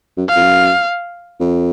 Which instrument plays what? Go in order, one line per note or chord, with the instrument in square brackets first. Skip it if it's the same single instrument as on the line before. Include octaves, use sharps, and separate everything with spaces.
[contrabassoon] F#2
[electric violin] F5
[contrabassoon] F2
F#2
F2